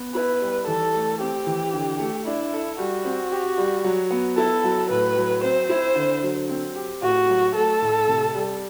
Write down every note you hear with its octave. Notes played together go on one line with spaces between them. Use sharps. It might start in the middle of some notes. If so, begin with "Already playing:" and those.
Already playing: B3
E4 B4
G3
E3 A4
A3
C4 G4
E3
D3
A3
D4 E4
A4
G3 F#4
C4
G4
G3
F#3
B3
E4 A4
F#3
A2 B4
F#3
C4 C5
E4
D3
F#3
C4
G4
A2 F#4
F#3
A3 A4
A2
C3
G3